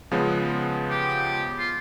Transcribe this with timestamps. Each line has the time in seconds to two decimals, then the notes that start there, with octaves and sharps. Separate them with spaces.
0.11 C#3 F3 G#3 B3
0.90 G4
1.59 F4